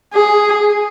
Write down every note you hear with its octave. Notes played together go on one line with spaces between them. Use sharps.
G#4